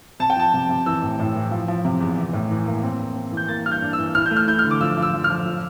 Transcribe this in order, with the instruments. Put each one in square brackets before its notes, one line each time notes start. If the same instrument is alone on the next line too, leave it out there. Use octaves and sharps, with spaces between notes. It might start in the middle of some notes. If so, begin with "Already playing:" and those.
[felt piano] C3 [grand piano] A5
[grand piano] G5
[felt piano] F3 [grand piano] A5
[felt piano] C3
C3
[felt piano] E3 [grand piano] E6
[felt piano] A2
A2
E3
F3
F3
C3
E2
E3
A2
E3
A#3
C4
C4
C4
E3
[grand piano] G6
[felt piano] A#3 [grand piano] A6
[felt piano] G2 [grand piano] F6
[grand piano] G6
[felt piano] D4
[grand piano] E6
[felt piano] E3
[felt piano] E4 [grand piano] F6
[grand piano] G6
[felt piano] A3
[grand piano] F6
[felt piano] E4 [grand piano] G6
[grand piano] F6
[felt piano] D3
[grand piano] D6
[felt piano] F3 [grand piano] E6
[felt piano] F3
[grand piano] E6
[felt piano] F3
[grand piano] F6
[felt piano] F3
F3